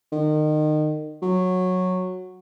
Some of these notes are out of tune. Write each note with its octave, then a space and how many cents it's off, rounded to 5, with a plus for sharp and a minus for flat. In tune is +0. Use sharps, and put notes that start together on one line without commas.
D#3 -30
F#3 -10